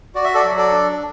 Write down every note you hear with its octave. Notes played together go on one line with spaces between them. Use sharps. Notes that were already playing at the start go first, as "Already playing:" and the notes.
F#4 D5
E5
A4 D5
F#3
A4 D5
D4